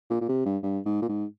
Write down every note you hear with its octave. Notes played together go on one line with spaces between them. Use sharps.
A#2
A#2
C3
G2
G2
G#2
A#2
G#2